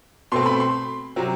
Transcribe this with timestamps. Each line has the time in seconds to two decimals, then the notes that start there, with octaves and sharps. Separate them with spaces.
0.32 B2 A3 C4 C6
0.46 B5
0.60 C6
1.16 C3 F#3 C4